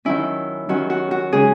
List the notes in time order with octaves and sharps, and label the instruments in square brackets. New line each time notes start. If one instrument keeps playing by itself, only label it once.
[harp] D#3 F#3 C#4 E4
D#3 F#3 C#4 F#4
F#4
F#4
C#3 G#3 C#4 G#4